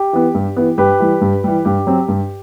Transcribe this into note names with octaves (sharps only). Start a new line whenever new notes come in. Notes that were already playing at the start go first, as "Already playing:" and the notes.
Already playing: G4
E3 B3
G2
E3 B3
G2 G4 B4
E3 G3
G2
E3 G3
G2 G4
F#3 C4
G2